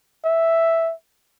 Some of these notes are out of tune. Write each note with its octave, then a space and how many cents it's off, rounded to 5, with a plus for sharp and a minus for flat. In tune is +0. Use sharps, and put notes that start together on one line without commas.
E5 +0